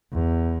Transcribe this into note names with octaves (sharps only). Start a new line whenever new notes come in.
E2